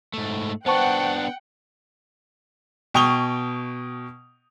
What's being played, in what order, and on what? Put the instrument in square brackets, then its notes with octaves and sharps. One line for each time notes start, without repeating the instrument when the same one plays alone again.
[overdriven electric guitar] G#2 A3
[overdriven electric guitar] B3 D4 [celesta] C5 A5 C#6 [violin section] F#5 G5
[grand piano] B2 G5 C#6 D#6 F7 G7